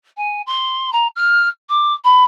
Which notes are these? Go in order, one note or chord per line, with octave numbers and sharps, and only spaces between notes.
G#5
C6
A#5
F6
D6
B5